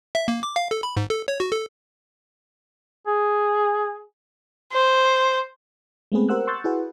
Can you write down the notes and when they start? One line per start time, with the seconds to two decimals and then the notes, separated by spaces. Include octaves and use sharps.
0.15 E5
0.28 A#3
0.43 D6
0.56 F5
0.71 A4
0.83 B5
0.97 G#2
1.10 A4
1.28 C#5
1.40 F#4
1.52 A4
3.07 G#4
4.72 C5
6.12 G#3 A3 B3 C4 G#4 B4
6.29 G4 A#4 C5 F#5 E6 F#6
6.47 C6 C#6 E6 F#6 G6 A6
6.64 E4 F#4 G#4 B4 F#5